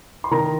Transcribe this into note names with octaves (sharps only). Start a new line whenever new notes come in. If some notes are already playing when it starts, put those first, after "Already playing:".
C6
D#3 A#5